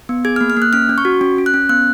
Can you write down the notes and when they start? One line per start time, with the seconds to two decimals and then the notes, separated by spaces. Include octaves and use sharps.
0.09 B3
0.25 G#4 G#6
0.36 F6
0.41 A#3
0.50 F6
0.57 A#3
0.62 F#6
0.73 C#4 F6
0.89 C#4
0.98 C#6
1.05 F#4
1.21 C#4
1.38 C#4
1.46 F#6
1.54 C#4
1.69 B3 F#6